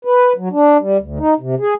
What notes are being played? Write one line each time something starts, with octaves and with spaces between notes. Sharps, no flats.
B4
F#3
D4
G3
D2
D#4
C3
G#4